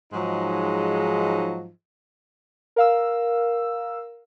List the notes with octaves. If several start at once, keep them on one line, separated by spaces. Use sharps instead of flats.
G#2 F3 F#3 G#3 D#4
A#4 F5 E6